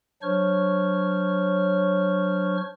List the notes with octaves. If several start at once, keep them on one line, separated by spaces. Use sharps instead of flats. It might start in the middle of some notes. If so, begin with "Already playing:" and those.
F#3 D4 C5 C#5 C#6 F6